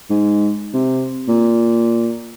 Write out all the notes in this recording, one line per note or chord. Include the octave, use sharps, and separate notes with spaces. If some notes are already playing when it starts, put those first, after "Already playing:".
G#2
C3
A#2